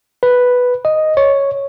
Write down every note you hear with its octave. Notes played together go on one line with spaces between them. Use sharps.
B4
D#5
C#5